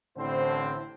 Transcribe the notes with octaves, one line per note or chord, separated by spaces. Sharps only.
A1 A2 D3 C4 E4 C5